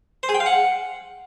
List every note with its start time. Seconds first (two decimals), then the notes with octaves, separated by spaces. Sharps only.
0.23 C5
0.29 G#4
0.35 G5
0.40 F5
0.46 F#5